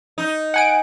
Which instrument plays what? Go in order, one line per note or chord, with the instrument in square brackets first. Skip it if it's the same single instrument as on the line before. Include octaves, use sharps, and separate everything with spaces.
[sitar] D#4
[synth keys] F#5 G#5 D7